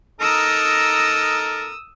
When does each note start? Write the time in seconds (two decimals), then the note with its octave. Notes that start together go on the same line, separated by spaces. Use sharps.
0.20 D#4 A4 A#4 D#6 E6